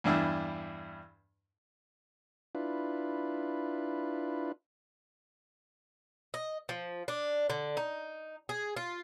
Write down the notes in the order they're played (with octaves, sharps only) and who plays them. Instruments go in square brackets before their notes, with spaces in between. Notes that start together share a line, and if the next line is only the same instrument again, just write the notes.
[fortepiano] E2 G2 D4 E4
[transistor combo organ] D4 E4 F4 B4
[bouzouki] D#5
F3
D4
D3
D#4
G#4
F4